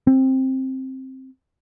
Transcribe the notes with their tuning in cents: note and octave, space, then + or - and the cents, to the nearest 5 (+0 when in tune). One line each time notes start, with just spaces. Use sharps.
C4 +10